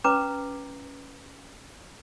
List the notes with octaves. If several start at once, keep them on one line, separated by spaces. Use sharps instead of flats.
C#4 B4 A#5 D6